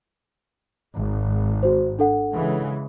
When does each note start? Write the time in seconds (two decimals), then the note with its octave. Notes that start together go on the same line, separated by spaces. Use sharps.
0.95 G#1
1.63 F#4 C5
1.99 D4 A4 F#5
2.34 C#3 E3 G#3